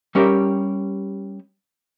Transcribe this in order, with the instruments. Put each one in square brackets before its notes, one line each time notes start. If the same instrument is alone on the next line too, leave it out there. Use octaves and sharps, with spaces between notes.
[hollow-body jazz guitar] G3 C#4 G4 A#4 E5